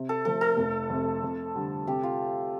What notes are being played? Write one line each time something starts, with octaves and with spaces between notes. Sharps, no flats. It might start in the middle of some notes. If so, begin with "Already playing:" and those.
Already playing: C3
A4
F3 A3 A4
A4
F1
F2 C3
F2
D3 G3
C3 G4
F4